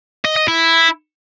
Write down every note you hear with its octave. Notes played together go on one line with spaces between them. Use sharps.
D#5
D#5
E4